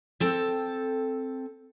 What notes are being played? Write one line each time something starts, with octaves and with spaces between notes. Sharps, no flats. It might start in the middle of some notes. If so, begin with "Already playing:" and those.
C4 A4 G5